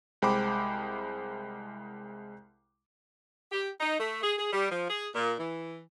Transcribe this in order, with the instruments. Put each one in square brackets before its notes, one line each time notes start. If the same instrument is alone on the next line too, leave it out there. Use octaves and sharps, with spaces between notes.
[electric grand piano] C2 G#3 C5 G5 B5 D6
[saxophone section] G4
D#4
A3
G#4
G#4
G3
F3
G#4
A#2
E3